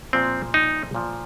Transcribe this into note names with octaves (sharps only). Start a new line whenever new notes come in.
A#2 F3 C4
D#4
A#2 F3